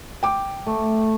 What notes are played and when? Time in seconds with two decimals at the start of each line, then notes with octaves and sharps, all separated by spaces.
0.23 G5 D6
0.66 A3